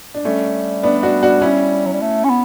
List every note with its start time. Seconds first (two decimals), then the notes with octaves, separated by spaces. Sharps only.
0.14 D4
0.25 G3 A3 C#4
0.83 B3 D4
1.03 D4 F#4
1.22 D4 F#4
1.42 C#4 E4
1.85 F#3
1.93 G3
2.01 A3
2.24 C#4
2.29 B3